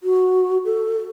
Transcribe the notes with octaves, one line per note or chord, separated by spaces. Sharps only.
F#4
A4